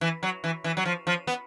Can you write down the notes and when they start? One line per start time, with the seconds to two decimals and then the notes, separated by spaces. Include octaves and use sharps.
0.01 E3
0.23 F#3
0.44 E3
0.64 E3
0.77 F#3
0.85 F3
1.07 F3
1.27 B3